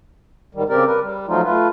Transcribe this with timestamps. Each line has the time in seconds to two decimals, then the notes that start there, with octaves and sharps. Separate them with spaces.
0.55 G#2 D#3 G3
0.69 C#3 C4 G4 A#4 D5
0.87 A#4 B4
1.02 G3
1.28 F3 F#3 A3 D#4 F4
1.44 A3 F4 B4